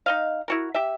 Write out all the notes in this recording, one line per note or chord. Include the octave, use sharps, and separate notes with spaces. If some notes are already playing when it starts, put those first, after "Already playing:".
D#4 D#5 F5
E4 F#4 A#4
G4 E5